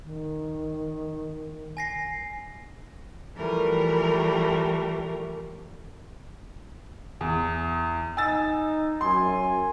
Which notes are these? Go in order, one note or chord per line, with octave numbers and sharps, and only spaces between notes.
D#3
G#5 A#6 C7
E3 F3 G3 A3 A#4
E2
D#4 G#5 E6 A6
F#2 G#5 C6